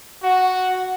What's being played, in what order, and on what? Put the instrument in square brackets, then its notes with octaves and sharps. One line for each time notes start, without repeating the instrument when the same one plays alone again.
[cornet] F#4 [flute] F#5